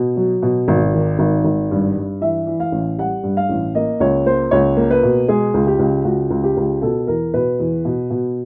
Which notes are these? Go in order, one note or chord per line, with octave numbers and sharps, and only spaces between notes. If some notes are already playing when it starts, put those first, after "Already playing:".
Already playing: B2
F#3
B2
G#1
D#3
G#1
G#1
G2
G2
E3 E5
E3
F5
A1
G3 F#5
G2
F5
A1
A#3 D#5
C#2 C#5
A#3 C5
C#2 C#5
A#3
B4
B2
G#3 G#4
C#2
G4
C#2
C#2 F#4
C#2
G4
C#2
B2 A4
E2 A#4
B2 B4
E2
B2
B2